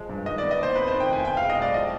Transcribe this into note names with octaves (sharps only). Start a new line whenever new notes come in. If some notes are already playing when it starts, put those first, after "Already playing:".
Already playing: F3 G#3
G2
D#3 D#5
B3 D5
D#5
D#2 C5
F2 B4
D#3 C5
G5
F1 G#5
B2 G5
G#3 F5
D#5
B1 D5
F3 D#5